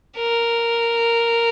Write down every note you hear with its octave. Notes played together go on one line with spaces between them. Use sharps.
A#4